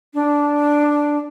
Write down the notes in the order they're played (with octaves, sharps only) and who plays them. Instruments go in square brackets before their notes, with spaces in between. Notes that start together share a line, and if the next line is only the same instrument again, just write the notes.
[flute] D4